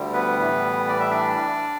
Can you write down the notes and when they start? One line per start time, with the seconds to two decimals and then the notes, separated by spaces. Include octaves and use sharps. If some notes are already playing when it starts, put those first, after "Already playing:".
Already playing: D2 D3 G3
0.13 B3 B4
0.39 A2 E3 G3
0.88 D5
1.00 E5
1.11 D4 D5